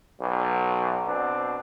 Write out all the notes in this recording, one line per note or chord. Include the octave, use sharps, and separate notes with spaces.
B1
B2 C4 D4